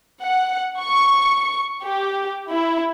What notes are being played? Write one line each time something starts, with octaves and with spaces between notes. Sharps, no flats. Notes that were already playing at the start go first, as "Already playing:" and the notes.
F#5
C#6
G4
E4